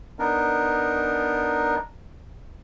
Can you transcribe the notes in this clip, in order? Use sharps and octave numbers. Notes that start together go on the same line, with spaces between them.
B3 D4 D#4 A#4